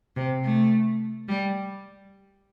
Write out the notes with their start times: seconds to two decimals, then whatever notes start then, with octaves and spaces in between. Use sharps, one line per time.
0.16 C3
0.44 A3
1.28 G3